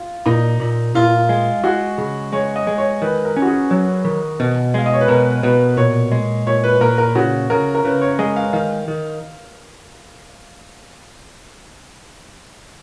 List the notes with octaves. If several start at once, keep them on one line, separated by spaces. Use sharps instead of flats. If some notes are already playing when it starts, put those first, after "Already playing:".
Already playing: F4
A#2 D#4
A#2
A#2 F4
G#3
G#3 F#4
C#3
G#3 C#5
D#5
G#3
C#5
D#3 B4
A#4
C#4
F#4
G#4
F#3
D#3
B2
G#3 F5
D#5
C#5
B4
B2 A#4
B2 B4
A#2 C#5
G#3
A#2 C#5
B4
A#2 A#4
A#4
C#3 F#4
C#3 A#4
A#4
C#3 B4
C#5
G#3 D#5
F5
D#3 F5
D#3